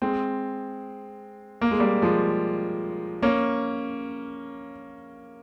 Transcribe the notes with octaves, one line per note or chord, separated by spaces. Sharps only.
G#3 C4
A#3
G#3
G3 A#3
F3 G#3
A#3 C#4